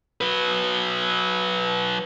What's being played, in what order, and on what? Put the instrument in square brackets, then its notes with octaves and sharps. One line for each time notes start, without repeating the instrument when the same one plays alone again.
[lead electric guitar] F#3 B4